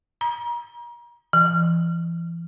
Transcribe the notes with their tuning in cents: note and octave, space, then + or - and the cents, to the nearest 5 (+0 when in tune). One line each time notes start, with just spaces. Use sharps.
A#5 +35
E3 +40